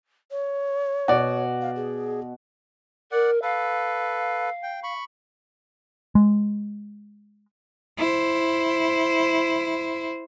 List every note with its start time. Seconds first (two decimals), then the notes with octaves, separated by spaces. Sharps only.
0.31 C#5
1.08 B2 F#4 D5
1.61 F5
1.76 G#4
3.12 A#4 D5 F#5
3.42 A4 B4 F5
4.63 G5
4.83 B5 C#6
6.15 G#3
7.98 E4 C5